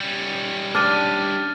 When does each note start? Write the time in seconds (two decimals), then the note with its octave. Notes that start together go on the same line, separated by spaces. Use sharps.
0.01 G3 C#4
0.75 D4 F6 A6 D#7